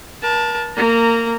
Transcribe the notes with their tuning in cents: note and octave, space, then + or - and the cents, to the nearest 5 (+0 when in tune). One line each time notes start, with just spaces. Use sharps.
A#4 +40 A5 +0
A#3 -20 A#5 -15